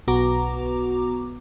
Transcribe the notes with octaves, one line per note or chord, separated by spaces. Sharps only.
B1 B3 F#4 A#5 D6